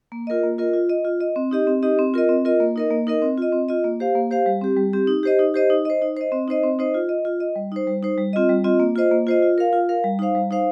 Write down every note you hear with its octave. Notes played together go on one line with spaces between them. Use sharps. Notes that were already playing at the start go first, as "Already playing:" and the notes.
A#3
F4 A#4 D#5
A#3
F4 A#4 D#5
F4
D#5
F4
D#5
C4
D#4 G4 D#5
C4
D#4 G4 D#5
C4
F4 A#4 D#5
C4
F4 A#4 D#5
A#3
D#4 A#4 D#5
A#3
D#4 A#4 D#5
C4
F4 D#5
C4
F4 D#5
A#3
G4 C5 F5
A#3
G4 C5 F5
G3
C4 G4
G3
C4 G4
D#4
G4 C5 D#5
D#4
G4 C5 D#5
D#4
C5 D#5
D#4
C5 D#5
C4
D#4 C5 D#5
C4
D#4 C5 D#5
F4
D#5
F4
D#5
G3
D#4 C5
G3
D#4 C5
G3
C4 F4 D#5
G3
C4 F4 D#5
A#3
F4 C5 D#5
A#3
F4 C5 D#5
F4
A#4 F5
F4
A#4 F5
G3
D#4 C5 F5
G3
D#4 C5 F5